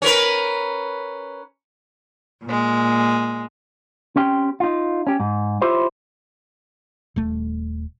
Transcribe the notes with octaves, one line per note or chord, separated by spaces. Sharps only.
C#4 A#4 B4
A#2 G#3
C4 C#4 G4 G5
D#4 F4
C#4 G4
G#2
E4 F4 G4 C5 C#5
D#1 A3